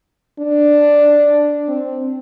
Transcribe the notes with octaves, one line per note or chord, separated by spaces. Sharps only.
D4
C4